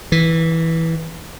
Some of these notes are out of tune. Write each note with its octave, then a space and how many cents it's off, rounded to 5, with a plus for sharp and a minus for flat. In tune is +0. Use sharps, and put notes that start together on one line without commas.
E3 -10